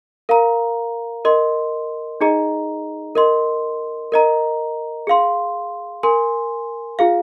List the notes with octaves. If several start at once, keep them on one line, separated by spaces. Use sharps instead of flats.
A#4 F5 A#5
A#4 D#5 C6
D#4 G#4 D#5 A#5
A#4 D#5 C6
A#4 D#5 A#5
G#4 F5 C6
A#4 G#5 C6
F4 G#4 F5